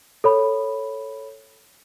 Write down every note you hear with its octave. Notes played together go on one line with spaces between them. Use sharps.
A4 C#5 B5